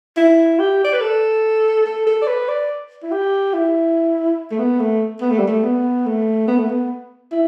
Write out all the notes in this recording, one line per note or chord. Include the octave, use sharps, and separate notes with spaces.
E4
G4
D5
B4
A4
A4
A4
D5
B4
D5
E4
G4
E4
A3
B3
A3
B3
A3
G3
A3
B3
A3
B3
A3
B3
E4